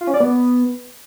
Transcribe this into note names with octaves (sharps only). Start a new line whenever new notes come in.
F4
C#4
D5
B3